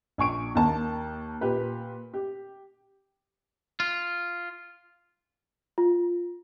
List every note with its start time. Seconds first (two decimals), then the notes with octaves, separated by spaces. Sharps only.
0.18 A#1 G#5 C#6 D7
0.55 D#2 A#3 A5
1.41 A#2 G4 B4
2.13 G4
3.80 F4
5.78 F4